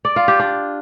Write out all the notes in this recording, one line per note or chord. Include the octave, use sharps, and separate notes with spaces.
D5
F4
G4
D4